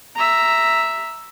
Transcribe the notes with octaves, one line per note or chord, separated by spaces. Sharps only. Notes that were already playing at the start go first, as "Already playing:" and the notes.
E5 A#5